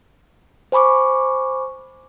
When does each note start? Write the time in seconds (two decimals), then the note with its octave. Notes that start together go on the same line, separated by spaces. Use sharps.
0.72 C5 G#5 B5 C#6 D6